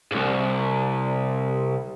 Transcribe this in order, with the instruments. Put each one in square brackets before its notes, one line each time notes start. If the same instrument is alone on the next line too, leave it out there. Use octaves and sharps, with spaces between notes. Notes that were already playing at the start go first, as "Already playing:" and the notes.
[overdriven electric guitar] C2 G#2